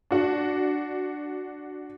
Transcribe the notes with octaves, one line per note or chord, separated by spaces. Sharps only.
D4 F#4